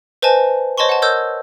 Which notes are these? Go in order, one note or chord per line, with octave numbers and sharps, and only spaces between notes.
B4 C5 D#5 G#5 A5
C5 C#5 D#5 A5 C6 C#6
F#5 A5
A#4 C#5 D#5 E6 G6 G#6